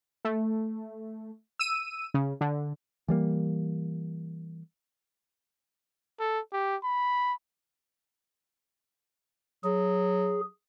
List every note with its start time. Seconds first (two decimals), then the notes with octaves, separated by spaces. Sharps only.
0.25 A3
1.59 E6 D#7
2.14 C#3
2.41 D3
3.08 E3 G3 A#3
6.20 A4
6.52 G4
6.84 B5
9.64 F#3 G#4